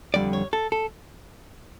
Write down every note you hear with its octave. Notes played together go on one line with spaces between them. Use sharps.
F2 D3 G3 D5
C#5
A4
A4